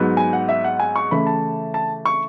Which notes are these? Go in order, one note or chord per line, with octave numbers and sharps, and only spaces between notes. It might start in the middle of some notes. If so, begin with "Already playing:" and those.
Already playing: G#2 F#3 B3
G#5
F#5
E5
F#5
G#5
C#6
C#3 E3 A3 E4 B5
A5
A5
C#6